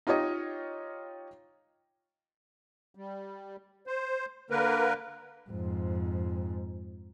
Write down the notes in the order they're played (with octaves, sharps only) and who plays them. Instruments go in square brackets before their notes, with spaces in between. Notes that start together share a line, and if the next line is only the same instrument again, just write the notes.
[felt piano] D#4 F4 G4 C#5 D#5
[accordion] G3
C5
D3 A#3 A#4 B4
[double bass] F2 G#2